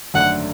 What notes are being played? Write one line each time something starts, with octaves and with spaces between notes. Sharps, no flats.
G#1 F#2 D3 A3 D4 F#5